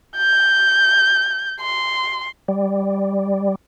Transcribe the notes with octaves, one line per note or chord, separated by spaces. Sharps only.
G6
C6
G3